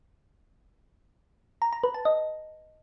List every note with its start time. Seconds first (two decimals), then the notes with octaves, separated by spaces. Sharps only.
1.62 A#5
1.73 A#5
1.84 B4
1.94 A5
2.05 D#5